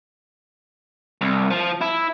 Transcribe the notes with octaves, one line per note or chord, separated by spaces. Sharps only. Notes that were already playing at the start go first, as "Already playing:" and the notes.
C2
F3
E4